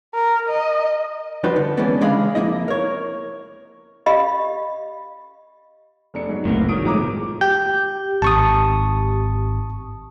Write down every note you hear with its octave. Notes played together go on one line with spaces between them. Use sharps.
A#4
D#5
F2 G3 D4 F#4 B4 C5
D3
E3 G#3 A#3 B3 C#4 D4
C#2 G#3 D4 D#5 F5 B5
F2 C#3 A#3 E4 D#5
A#4 C#5
G4 D#5 F5 B5
F1 D4 C#7
G#2 F#3
F#1 C2 A2 A#3 B3
D#3 F#3 D#6 D7
G1 A2 D#3 F3 F#3 G#3 A#5 D6
G4 G6
G#1 A5 C#6 D#6